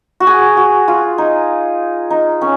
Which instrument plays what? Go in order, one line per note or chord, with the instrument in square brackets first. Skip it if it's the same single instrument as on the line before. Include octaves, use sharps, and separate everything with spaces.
[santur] F#4
G#4
F#4
F4
D#4
D#4
C#4